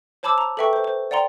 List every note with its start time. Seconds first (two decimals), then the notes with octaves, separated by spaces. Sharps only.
0.23 C5 C#5 A5 B5 D6 E6
0.38 A#5
0.57 A4 B4 E5 G5 C#6
0.73 C5
0.84 C5
1.11 D5 F#5 G5 A#5 C6